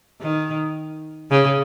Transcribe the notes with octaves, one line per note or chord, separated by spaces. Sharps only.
D#3
C#3